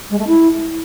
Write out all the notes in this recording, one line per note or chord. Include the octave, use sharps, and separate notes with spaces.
G#3
A3
E4